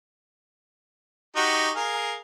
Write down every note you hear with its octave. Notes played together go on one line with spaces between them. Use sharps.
D#4 F#4 G4
G#4 A#4 F5